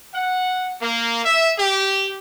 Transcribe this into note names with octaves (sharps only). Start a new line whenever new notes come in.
F#5
A#3
E5
G4